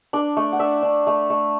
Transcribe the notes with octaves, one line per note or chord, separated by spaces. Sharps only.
D4 D5
A3
F#5
D4 E5
D4
A3
A3